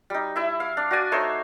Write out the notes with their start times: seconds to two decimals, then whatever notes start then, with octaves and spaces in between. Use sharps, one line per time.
0.10 G3 D#4
0.36 E4 E5
0.60 F5
0.77 D4
0.91 F#4 D5 G#5
1.12 A3 D#4 C5 C#5